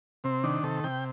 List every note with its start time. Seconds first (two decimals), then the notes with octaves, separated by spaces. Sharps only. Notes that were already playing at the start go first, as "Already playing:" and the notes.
0.24 C3 C4
0.44 D#3 D4
0.63 C3 A4
0.84 C3 G5